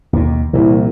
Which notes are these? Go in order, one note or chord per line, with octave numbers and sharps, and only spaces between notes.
D#2 B2
C2 A#2 E3